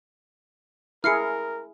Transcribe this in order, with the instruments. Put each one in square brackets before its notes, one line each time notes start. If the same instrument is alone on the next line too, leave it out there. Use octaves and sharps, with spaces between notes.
[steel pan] E4 G#4 [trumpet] A#4 [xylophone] F6 C7 C#7